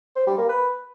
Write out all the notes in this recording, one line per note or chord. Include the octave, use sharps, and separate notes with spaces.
C5
G3
A#3
B4